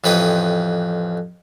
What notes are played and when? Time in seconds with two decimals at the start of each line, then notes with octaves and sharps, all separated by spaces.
0.04 A1 F2 B4 G5 D#6